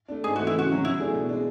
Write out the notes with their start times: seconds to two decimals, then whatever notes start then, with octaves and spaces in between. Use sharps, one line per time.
0.08 A3 D4
0.24 G#2 G#4
0.36 E3 A3 F#4
0.47 E4
0.55 C#3 F#4
0.69 F#3 C#4
0.84 F#3 E4
1.00 A3 D4 G#4
1.14 B2
1.29 G#3 D4